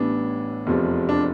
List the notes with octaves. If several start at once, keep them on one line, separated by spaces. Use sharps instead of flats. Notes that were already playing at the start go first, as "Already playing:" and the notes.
Already playing: A1 A2 E3 G3 B3 D4
F1 E2 C3 F3
D4